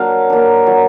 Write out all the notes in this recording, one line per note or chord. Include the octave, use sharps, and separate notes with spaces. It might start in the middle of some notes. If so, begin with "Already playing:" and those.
Already playing: F#3 A#3 D4 F5
A#3 D4
F#3